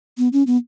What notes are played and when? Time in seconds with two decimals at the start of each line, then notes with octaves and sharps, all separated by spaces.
0.18 B3
0.33 C#4
0.47 B3